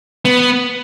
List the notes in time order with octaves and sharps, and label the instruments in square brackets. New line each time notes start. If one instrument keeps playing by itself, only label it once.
[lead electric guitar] B3